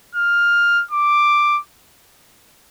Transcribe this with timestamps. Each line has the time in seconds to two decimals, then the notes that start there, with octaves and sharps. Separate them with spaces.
0.15 F6
0.91 D6